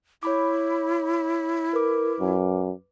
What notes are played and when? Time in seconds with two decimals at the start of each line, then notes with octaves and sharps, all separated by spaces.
0.23 E4 C#5 B5 D6
1.74 A#4 B4 D6
2.19 F#2